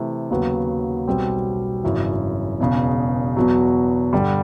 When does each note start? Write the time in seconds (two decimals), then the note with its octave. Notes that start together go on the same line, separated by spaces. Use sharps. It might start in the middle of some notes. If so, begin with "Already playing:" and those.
Already playing: C3 E3 A3
0.30 D#2 C#3 F#3 B3
1.07 B1 B2 G3 C4
1.84 G#1 F#2 C#3 E3
2.60 E1 E2 C#3
3.36 E2 B2 F#3
4.13 G2 D3 G3